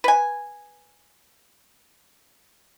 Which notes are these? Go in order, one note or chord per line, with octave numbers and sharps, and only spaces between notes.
B4 G#5